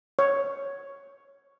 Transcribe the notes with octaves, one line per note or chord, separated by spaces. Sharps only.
C#5